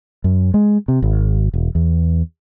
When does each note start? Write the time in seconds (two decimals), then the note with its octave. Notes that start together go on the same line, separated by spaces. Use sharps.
0.24 F#2
0.54 G#3
0.88 C3
1.02 G#1
1.54 E1
1.75 E2